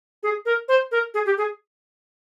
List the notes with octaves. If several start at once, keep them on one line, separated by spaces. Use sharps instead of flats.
G#4
A#4
C5
A#4
G#4
G4
G#4